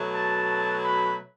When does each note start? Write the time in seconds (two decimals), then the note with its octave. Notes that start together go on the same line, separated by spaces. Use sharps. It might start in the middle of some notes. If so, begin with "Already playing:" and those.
Already playing: B2 F#3 A3
0.13 A5
0.84 B5